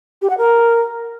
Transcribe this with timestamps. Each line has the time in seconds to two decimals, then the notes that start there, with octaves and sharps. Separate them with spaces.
0.22 G4
0.30 F#5
0.38 A#4